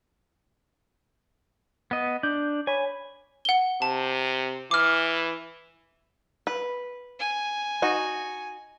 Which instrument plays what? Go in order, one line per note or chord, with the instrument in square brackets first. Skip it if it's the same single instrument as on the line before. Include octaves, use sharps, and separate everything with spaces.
[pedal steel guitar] B3 D#5
[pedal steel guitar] D4 [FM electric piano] G6
[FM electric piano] C#5 B5 [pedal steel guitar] G#5
[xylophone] F#5 G7
[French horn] C3 [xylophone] A5
[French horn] E3 [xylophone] D6 F6
[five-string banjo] B4
[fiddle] G#5
[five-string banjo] D#4 F#4